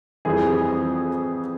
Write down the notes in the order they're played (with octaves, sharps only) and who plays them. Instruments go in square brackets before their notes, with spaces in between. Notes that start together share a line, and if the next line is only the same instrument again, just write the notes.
[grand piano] F2 E3 G3 C4 G#4 G#5